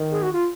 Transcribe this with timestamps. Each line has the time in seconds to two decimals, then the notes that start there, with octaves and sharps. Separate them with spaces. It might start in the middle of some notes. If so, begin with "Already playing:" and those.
Already playing: D#3
0.11 G#4
0.22 F#4
0.33 F4